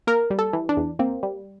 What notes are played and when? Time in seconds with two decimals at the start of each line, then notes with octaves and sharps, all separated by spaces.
0.07 A#3 A#4
0.30 G3
0.39 A4
0.53 E3
0.69 D4
0.77 E2
0.99 A#3 C4
1.23 G3